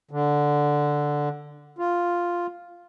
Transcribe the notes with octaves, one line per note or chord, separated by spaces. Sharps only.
D3
F4